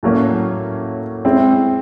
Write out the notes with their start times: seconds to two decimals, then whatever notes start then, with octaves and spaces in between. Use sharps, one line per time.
0.03 A2 F#3 A#3 C#4
1.25 G#3 C4 E4